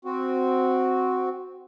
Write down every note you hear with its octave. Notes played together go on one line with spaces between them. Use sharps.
C4 F#4